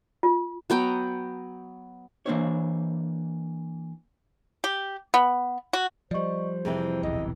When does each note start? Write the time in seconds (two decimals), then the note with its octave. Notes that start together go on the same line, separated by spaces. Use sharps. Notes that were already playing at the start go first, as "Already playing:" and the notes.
0.23 F4
0.70 F#3 B3 G5 A#5
2.26 E3 A#3 B3 D4 C5 C#5
4.64 G4
5.14 B3
5.73 F#4
6.11 F3 G3 C5 D5 D#5 C#6
6.65 F2 C3 E3 G#4
7.03 D#1 B1 E2 D#5